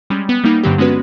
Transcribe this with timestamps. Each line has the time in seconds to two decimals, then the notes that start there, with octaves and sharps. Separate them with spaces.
0.10 G3 G#3 C#4
0.29 B3
0.44 G3 A#3 D#4
0.64 G2 D3 F#3 C4 G4
0.78 G#3 B3 C#4 F#4 B4